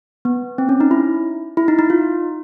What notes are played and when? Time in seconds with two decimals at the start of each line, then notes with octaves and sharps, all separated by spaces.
0.25 B3
0.58 C4
0.69 C#4
0.80 D#4
0.91 E4
1.57 E4
1.68 D#4
1.79 D#4
1.90 F4